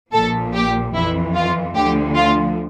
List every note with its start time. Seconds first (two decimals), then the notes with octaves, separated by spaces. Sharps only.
0.13 A#1 A#2 F3 A4
0.54 G4
0.94 F2 E3 E4
1.35 F4
1.75 D2 D3 F3 G4
2.16 F4